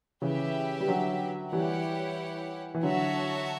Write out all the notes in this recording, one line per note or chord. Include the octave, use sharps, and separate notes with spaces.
C#3 E3 C#4 G4 B4 E5
G3
D3 F#3
E3 G3 E4 G4 C#5 F#5
E3
D3 F#3 F#4 C#5 E5 A5